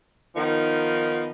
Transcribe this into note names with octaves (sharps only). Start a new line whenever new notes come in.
D#3 F3 B3 D#4